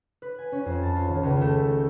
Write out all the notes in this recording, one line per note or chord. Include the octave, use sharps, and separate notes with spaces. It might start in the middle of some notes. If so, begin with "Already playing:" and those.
B4
G#5
C#4
F2
A5
F4
D#1
C#2
A3
A5
G6